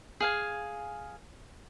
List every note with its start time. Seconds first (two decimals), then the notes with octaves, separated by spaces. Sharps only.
0.20 G#4 F5 G#5